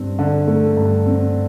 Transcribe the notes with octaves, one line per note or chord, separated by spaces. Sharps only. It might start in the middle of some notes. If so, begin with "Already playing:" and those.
Already playing: G2 C4
D3
A3
G2
C4